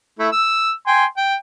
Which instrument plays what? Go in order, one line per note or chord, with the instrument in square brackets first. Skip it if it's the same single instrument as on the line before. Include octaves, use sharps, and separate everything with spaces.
[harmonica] A3 E4
E6
G5 G#5 C6
G5